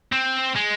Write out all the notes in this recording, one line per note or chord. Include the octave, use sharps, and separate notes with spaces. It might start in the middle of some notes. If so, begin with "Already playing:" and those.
C4
G#3